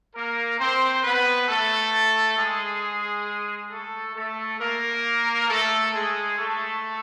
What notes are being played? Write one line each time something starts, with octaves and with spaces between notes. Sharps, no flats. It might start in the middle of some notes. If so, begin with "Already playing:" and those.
A#3 A#4
C4 C5
B3 B4
A3 A4
G#3 G#4
A3 A4
A3 A4
A#3 A#4
A3 A4
G#3 G#4
A3 A4